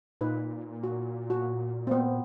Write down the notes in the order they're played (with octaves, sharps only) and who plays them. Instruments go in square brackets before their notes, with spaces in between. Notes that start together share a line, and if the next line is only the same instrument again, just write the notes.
[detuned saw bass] A#2 [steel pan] D#4 B4
[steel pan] F#4
F#4
B3 C4